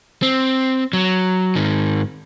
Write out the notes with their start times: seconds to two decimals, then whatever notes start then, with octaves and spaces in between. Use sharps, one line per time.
0.22 C4
0.93 F#3
1.55 G#2 D#3